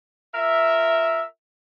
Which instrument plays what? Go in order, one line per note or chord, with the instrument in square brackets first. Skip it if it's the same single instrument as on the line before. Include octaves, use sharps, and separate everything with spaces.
[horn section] F4 A#4 E5